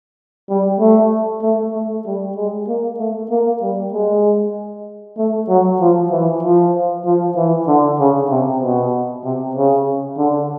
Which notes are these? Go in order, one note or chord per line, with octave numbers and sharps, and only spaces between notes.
G3
A3
A3
A3
G3
G#3
A#3
A3
A#3
G3
G#3
A3
F#3
F3
E3
F3
F3
E3
D3
C#3
C3
B2
C3
C#3
D3